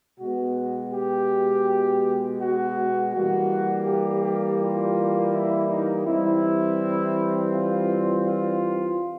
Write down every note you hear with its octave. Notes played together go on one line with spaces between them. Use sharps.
B2 G#3 B3 F#4
G4
F#4
E3 G3 A#3 F#4
G4
G4
F4
E4
D#4
E3 G3 C4 E4
F4
F4